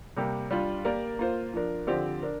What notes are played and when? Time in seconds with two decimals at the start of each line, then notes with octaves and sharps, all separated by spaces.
0.17 C3 G3 A#3 G4
0.51 G3 D4 F4
0.85 A#3 G4 A#4 D5
1.19 A#3 F4 C5
1.54 F3 D4 A#4
1.87 D3 F3 C4 G4 D5
2.22 D4 A#4